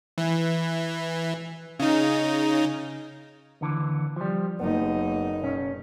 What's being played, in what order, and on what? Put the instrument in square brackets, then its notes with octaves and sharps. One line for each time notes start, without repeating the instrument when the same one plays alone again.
[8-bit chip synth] E3
C#3 D#4
[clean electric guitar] D#2 D3 E3
F3 G3
[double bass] F#1 D#4 [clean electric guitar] B3
[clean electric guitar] B1 C#4